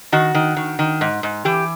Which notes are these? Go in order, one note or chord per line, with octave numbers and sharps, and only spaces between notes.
D#3 F#4
D#3
D#3
D#3
G#2
G#2
E3 G4